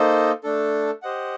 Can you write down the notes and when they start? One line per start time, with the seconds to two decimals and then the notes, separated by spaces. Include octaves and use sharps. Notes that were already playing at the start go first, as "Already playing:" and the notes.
Already playing: A#3 D#4 A4 C5 D#5
0.44 A3 D4 A4
1.02 G4 C5 D#5 F#5